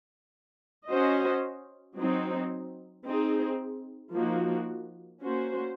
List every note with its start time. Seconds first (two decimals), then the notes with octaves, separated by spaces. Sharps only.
0.89 C#4 F#4 C5 D#5
1.98 F#3 C4 D#4
3.06 C4 D#4 G#4
4.14 F3 A#3 D#4 F#4
5.22 A#3 C#4 F#4 C5